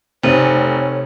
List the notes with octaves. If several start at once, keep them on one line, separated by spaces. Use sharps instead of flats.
F1 C3 D#4 C5 C#5 D#7